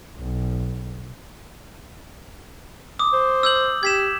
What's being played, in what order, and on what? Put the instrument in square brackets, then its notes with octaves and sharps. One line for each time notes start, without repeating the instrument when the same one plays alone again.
[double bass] B1
[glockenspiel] D6 D#6
[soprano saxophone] C5
[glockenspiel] E6 G6 F#7
[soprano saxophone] G4 [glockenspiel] G#6 B6 E7